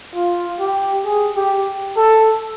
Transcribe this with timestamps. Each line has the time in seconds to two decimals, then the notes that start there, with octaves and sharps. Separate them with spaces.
0.14 F4
0.59 G4
1.05 G#4
1.36 G4
1.97 A4